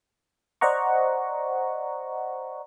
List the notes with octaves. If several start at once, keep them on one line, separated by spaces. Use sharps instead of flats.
C5 D5 D#5 F#5 A#5 C#6